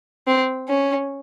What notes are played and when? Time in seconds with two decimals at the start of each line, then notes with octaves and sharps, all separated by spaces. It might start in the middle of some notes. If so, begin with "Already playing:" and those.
0.27 C4
0.69 C#4